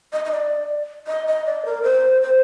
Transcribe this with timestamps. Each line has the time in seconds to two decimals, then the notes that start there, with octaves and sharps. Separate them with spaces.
0.13 D#5
0.25 D#5
0.31 D5
1.07 D#5
1.27 D#5
1.46 D5
1.65 A#4
1.83 C5
2.22 C5